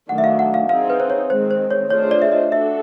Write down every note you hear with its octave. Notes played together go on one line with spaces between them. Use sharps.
D#3 F#3 A3 D4 F#5
E5
F5
F#5
F5
C4 D#4 G#4 F5
B4
C5
C#5
D#3 G#3 C4 C5
C5
C#5
A3 D4 F4 G#4 C5 C#5
D5
E5
D#5
D4 F#4 A4 E5